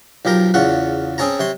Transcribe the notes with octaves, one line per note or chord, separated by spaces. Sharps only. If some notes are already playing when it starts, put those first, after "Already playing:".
B1 F3 G4 A#4 A#5
E2 C#3 F4 F#5 C#6
C4 C#4 G#4 C#5 A5 A#5
C3 C#5 C6